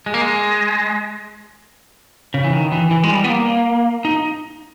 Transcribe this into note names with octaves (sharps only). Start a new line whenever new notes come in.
G#3
A#3
G#3
C#3
E3
D#3
E3
E3
G#3
G3
B3
A#3
D#4